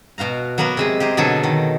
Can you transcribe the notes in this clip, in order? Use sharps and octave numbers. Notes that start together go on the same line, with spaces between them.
B2 F#4 F5 A#5
F#3 A#3 B3 A#4 B4
C3 G#3 G#4
G4 G#4 A#4 C5
B2 D3 F#3 G#4 A4
D#3